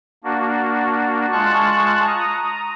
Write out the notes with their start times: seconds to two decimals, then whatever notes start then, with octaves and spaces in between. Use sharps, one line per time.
0.24 A#3 D4 F#4
1.32 G#3 F4 A5 C#6 F#6
2.07 A#5 D#6